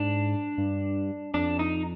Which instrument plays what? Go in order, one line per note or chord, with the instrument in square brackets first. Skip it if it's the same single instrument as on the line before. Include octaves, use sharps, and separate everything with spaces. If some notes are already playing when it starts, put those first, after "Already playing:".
Already playing: [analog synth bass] G#2 [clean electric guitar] D4
[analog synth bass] G2
[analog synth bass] F2 [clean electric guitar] D4
[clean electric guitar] D#4